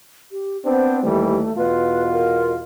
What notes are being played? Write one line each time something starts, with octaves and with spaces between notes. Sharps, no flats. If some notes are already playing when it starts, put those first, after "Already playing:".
G4
B3 C4 D4 C5
D#2 E3 G3 A3
E2 B2 F4 B4
A#4